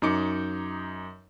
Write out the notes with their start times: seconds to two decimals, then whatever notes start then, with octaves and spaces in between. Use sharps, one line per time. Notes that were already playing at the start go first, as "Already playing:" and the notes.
0.02 F#2 D#4 D6 C#7